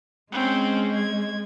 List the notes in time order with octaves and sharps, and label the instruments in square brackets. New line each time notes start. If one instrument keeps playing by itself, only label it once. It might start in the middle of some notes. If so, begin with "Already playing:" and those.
[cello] G#3 [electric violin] C4 C#4
[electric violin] G#6